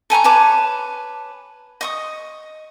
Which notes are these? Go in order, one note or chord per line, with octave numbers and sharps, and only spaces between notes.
A4 G#5 A#5 C#6
B4 C#5 A5 D6
D#5 C#6 D#6